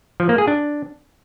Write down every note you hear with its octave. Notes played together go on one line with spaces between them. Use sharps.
F3
A#3
G#4
D4